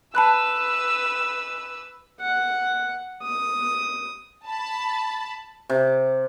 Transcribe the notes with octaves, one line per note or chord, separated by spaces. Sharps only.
B4 A5 B5 E6 F#6
F#5
D#6
A5 B5
C3